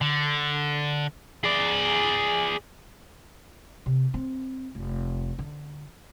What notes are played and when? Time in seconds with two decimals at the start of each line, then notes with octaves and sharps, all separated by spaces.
0.01 D3
1.44 G#4 D5
3.86 C3
4.14 C4
4.75 F1
5.39 D3